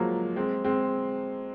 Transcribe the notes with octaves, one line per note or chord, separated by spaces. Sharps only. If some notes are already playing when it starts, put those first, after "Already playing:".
Already playing: F3 F#3 G#3 A#3
G#3 C4
G#3 C4